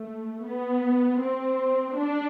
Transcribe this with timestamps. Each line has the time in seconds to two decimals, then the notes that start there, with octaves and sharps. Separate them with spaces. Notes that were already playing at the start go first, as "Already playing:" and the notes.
Already playing: A3
0.45 B3
1.21 C4
1.98 D4